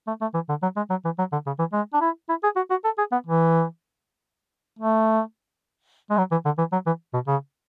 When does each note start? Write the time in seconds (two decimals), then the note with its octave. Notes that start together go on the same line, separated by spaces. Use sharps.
0.07 A3
0.21 A3
0.34 E3
0.49 D3
0.62 F#3
0.76 G#3
0.90 F#3
1.05 E3
1.18 F#3
1.32 D3
1.46 C#3
1.59 E3
1.73 G#3
1.93 D4
2.01 E4
2.29 E4
2.43 G#4
2.56 F#4
2.70 F#4
2.84 A4
2.98 G#4
3.12 B3
3.26 E3
4.79 A3
6.10 G#3
6.18 F#3
6.31 E3
6.45 D3
6.58 E3
6.72 F#3
6.86 E3
7.14 B2
7.27 C#3